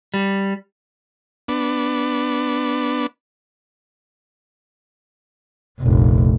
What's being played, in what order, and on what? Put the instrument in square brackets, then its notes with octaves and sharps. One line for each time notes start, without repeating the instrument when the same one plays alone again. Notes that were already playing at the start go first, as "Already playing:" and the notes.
[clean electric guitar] G3
[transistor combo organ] B3 D4
[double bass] F1 A#1